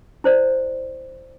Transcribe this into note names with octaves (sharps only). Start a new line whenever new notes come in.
E4 C5 D5